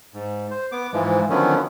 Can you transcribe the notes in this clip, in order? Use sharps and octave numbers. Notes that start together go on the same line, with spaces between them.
G#2
C5
B3 D6
G#2 E3 F3 G#3
D3 D#3 F3 F#3 B3 C#4